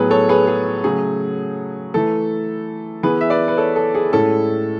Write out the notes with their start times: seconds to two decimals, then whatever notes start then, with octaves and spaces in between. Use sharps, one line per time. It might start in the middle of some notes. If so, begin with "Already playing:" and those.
Already playing: A2 F#3 B3 E4 G#4 B4
0.11 A4 C#5
0.29 G#4 B4
0.47 G#4
0.84 C#3 F#3 A3 G#4
1.94 E3 A3 E4 A4
3.03 E3 B3 E4 G#4 B4
3.21 E5
3.30 B4 D5
3.48 B4
3.57 A4 C#5
3.76 A4
3.94 G#4
4.13 A2 G#3 C#4 E4 A4